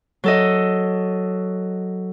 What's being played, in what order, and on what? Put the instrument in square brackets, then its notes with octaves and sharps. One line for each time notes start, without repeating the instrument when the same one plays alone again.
[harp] F#3 A4 D#5